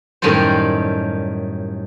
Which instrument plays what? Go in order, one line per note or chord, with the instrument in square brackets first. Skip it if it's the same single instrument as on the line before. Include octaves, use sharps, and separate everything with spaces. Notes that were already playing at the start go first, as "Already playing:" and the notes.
[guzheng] F#2 A2 D#3 G3 A4 C5